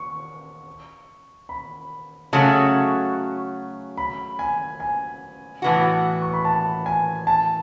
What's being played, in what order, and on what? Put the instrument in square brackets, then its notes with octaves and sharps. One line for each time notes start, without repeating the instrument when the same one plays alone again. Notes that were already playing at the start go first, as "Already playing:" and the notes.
Already playing: [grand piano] C#6
B5
[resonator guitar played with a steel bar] C#3 F#3 A3 C#4 F#4
[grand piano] B5
G#5
G#5
[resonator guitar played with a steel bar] A2 E3 B3 F#4
[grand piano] C#6
B5
A5
G#5
A5